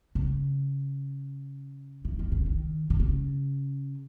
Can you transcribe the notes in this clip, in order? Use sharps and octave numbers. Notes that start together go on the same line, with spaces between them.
C#3
E3
D#3
C#3
D#3
D#3
C#3